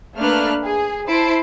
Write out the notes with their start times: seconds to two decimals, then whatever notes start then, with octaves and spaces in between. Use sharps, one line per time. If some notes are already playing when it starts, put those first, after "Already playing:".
0.19 A3 A#3 D4 B4 F6 F#6
0.63 G#4
1.07 E4 C5 A5 C7 D7